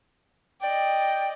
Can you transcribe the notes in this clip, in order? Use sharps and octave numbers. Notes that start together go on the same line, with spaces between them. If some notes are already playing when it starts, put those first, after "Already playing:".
D5 D#5 G5